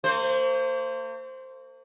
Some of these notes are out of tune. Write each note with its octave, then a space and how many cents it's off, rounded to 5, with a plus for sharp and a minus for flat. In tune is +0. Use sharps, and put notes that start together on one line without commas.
A#3 -45 C5 +0